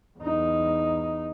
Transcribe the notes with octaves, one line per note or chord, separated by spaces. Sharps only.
E2 D#4